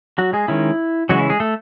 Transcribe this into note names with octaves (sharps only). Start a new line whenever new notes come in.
F#3 F#4
G#3 G#4
D#3 G#3 C#4 E4
C#3 E3 F#3 G#3 C#4 F#4
E4
G#3 G#4
A3 A4